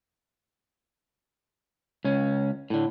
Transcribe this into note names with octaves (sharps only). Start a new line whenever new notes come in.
C#2 C#4
A2 D3